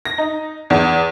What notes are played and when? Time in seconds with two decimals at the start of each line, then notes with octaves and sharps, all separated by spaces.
0.05 A#6
0.18 D#4
0.70 E2